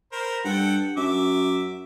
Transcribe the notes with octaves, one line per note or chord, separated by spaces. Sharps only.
A#4 C5 B5
G2 A4 F#5 G5
F#2 E5 D6